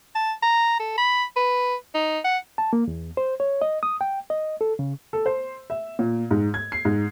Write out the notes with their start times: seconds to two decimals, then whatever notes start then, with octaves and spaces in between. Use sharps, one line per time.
0.15 A5
0.43 A#5
0.79 A4
0.98 B5
1.36 B4
1.94 D#4
2.24 F#5
2.58 A5
2.73 A#3
2.88 E2
3.17 C5
3.40 C#5
3.62 D#5
3.83 D#6
4.01 G5
4.30 D#5
4.61 A4
4.79 C#3
5.13 A4
5.26 C5
5.70 E5
5.99 A#2
6.31 G#2
6.54 G#6
6.72 C7
6.85 G#2